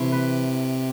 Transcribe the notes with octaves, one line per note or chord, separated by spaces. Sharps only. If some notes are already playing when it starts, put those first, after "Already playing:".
Already playing: C3 E3 A3 E4
B4